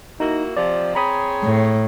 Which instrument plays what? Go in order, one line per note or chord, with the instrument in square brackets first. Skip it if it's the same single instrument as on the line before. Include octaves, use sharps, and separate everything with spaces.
[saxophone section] A#3 E4 F#4 [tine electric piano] D#4
[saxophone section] C3 F3 [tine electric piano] D5
[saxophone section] C4 G#4 C#5 [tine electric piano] A#5 B5 D#6
[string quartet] A2